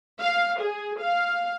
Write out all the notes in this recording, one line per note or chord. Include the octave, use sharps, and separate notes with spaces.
F5
G#4
F5